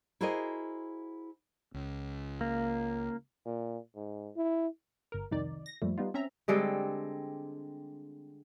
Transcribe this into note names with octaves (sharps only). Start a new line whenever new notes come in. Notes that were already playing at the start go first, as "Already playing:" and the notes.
E4 F#4 G#4 A#4 C5 D#5
C#2
A#3
A#2
G#2
E4
G1 A#4
C2 F2 D#3 D#4 D5
A#6
F#2 A#2 F3 G3 A3
G3 B3 D#4 F4
C4 C#4 E5 A#5
D3 G3 G#3 C4